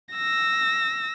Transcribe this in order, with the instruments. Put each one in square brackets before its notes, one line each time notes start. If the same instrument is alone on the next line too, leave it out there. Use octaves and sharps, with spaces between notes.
[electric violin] E6 A#6